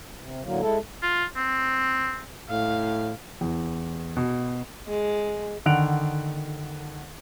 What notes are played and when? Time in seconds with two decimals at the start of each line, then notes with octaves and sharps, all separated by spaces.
0.20 C3
0.44 A2 D3 F#3 A#3
0.61 G#3 E4 A4
1.03 F4
1.36 C4
2.50 A2 F5
3.41 E2
4.17 B2
4.88 G#3
5.66 D3 D#3 F#5 F#6 D7 F7